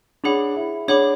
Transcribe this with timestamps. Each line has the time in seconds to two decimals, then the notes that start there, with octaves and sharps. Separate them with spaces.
0.24 D4 G#4 C#5 F#5 B5 D6
0.56 E4
0.88 D4 G#4 C#5 F#5 B5 D6